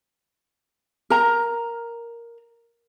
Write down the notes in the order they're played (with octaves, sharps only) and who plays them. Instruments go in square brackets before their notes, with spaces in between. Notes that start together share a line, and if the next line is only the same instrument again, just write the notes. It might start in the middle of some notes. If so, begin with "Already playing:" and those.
[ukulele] A#4 A#5